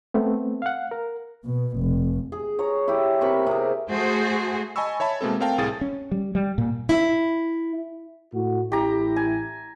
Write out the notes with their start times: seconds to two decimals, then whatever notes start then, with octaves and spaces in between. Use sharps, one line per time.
0.14 A3 B3 C4
0.62 F5 F#5
0.91 A#4
1.45 B2
1.78 F1
2.32 G#4
2.59 C#5 A#5
2.88 E4 G4
3.21 C3 A#4 B5 C#6
3.47 C3 G#4
3.90 A3 F#4 G#4 C5
4.76 D#5 G#5 A5 B5 C#6 E6
5.00 C#5 E5 A5 B5
5.21 B2 G#3 A#3 C4 A4
5.40 A3 C4 A#4 F5 G5 A5
5.58 C2 A2 G#4 A6
5.81 C#4
6.12 G3
6.35 G3
6.58 A#2
6.89 E4
8.34 A2 F#4
8.72 A1 E4 G4 A#5
9.16 G#5